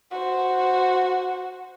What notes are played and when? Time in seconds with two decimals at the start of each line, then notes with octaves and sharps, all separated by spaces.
0.11 F#4 C5